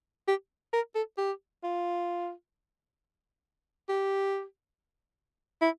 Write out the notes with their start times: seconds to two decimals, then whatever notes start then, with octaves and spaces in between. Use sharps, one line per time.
0.28 G4
0.73 A#4
0.95 A4
1.18 G4
1.63 F4
3.89 G4
5.62 E4